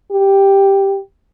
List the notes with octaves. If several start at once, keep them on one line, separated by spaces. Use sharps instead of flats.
G4